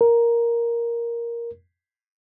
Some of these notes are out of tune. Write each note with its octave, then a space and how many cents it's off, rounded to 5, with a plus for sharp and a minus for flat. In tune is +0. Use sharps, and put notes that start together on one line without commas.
A#4 +5